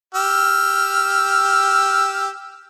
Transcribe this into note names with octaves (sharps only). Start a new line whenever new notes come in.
G4 E6 F6